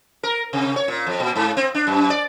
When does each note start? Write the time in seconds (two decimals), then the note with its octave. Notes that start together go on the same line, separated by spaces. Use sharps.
0.23 A#4
0.53 C3
0.76 C#5
0.88 A#2
1.07 F2
1.20 A#2
1.36 G#2
1.57 C4
1.75 D4
1.87 F#2
2.10 D5